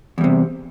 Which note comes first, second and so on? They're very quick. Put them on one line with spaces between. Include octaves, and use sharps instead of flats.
E2 G3 C3